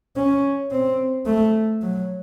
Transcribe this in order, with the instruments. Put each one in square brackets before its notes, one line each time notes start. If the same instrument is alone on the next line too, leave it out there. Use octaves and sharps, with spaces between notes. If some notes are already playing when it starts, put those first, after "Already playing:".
[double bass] C#4
C4
A3
F#3